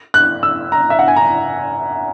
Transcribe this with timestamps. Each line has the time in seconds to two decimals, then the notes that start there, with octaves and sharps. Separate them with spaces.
0.14 F#6
0.43 E6
0.72 A#5
0.90 E5
0.99 F#5
1.08 G#5
1.16 A#5